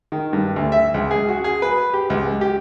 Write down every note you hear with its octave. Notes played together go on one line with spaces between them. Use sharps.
D#3
G2
D2
E5
C#2
G#4
F#4
G#4
B4
G4
C#2
G4